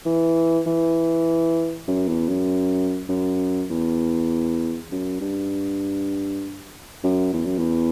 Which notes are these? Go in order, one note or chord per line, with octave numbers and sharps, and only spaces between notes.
E3
E3
F#2
E2
F#2
F#2
E2
F#2
G2
F#2
E2
F#2
E2